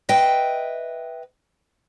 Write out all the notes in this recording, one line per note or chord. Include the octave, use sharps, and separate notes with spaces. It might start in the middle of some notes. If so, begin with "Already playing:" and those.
B4 D#5 E5 G5